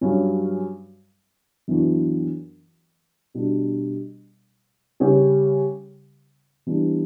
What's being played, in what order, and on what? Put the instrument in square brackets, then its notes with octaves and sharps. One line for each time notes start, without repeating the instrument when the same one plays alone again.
[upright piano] G2 F#3 C#4
F#2 E3 B3 D4 F#4
B2 G3 D4
C#3 G3 C#4 G4
E3 G3 B3 D4